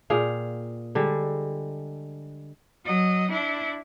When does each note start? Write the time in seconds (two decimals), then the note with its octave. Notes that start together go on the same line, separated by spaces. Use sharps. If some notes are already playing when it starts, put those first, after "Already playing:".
0.10 A#2 G#4 F5 G5
0.95 D3 G3 G#3
2.85 F#3 D#5
3.31 D4 E4